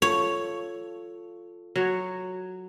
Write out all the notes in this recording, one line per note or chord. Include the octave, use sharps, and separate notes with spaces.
F4 A4 C#5
F#3 C#5